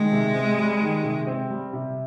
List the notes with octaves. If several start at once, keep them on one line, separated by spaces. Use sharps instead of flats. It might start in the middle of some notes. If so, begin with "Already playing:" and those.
Already playing: D#3 G#3
C3
C4
G3
D#3
C3
C4
G3
C3